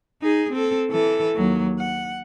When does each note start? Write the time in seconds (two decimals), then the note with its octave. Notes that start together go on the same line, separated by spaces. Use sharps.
0.22 D#4 G#4
0.52 C4 A4
0.90 E3 A4
1.36 D#2 F#3
1.79 F#5